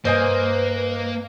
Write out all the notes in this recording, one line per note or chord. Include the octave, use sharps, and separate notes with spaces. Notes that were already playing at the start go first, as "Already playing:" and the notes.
G2 A#3 B4 C5 D#5 G#5